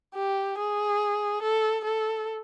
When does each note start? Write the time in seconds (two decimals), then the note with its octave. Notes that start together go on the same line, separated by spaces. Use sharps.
0.15 G4
0.58 G#4
1.43 A4
1.85 A4